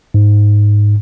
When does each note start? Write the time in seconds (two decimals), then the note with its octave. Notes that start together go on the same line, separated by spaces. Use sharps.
0.14 G#2